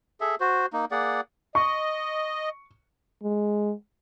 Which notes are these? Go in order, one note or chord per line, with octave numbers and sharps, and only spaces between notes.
G#4 A4 E5
F#4 C5
A#3 D#4
A#3 G#4 D5 F#5
D#5 C#6
G#3